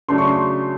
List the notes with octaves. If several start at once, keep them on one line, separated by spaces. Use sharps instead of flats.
C#3 F#3 A3 D4 C6
C#6
C6